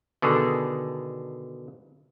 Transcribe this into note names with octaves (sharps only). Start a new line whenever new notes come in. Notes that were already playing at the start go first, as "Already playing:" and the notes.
B2 D3 D#3 G#4 A4